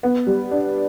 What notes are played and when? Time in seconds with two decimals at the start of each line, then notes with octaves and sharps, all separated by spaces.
0.03 B3
0.27 G3
0.51 D4